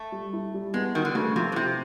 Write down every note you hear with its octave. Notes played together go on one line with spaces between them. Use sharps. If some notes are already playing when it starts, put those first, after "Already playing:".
Already playing: A3
G3
E4
G3
G#3 B3
D#3 F#4
D3
C#3 A3
C3 F3
B2
C3 E4